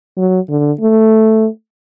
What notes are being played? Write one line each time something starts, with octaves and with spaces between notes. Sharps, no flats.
F#3
D3
A3